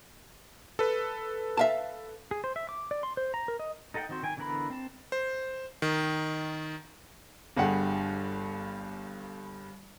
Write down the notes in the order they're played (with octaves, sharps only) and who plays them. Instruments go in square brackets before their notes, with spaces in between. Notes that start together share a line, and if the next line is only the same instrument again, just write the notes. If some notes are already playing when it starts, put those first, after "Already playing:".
[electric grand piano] A4 B4
[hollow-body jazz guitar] E5 F5 A5
[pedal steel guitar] G#4
C5
E5
D6
D5
C6
C5
A#5
A#4
D#5
D#4 A4 D#5 F#5 G5
D#3 C4 F#4 C5
D#3 G5 G#5
D3 E3 B3 A#4 B5
C4 A5
[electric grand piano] C5
D#3
[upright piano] G1 G2 G3 G#4 F#5